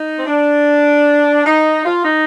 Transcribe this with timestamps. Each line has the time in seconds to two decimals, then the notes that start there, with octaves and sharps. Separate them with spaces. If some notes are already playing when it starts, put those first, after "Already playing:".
Already playing: D#4
0.18 C4
0.27 D4
1.46 D#4
1.85 F4
2.05 D#4